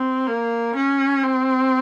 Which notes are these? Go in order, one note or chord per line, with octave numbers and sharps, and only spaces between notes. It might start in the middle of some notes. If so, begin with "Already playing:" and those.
Already playing: C4
A#3
C#4
C4